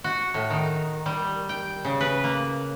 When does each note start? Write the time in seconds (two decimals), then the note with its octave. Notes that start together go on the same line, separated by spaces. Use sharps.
0.04 F#4
0.34 A2
0.50 D#3
1.06 G3
1.49 G5
1.85 C#3
2.01 B4
2.24 A#3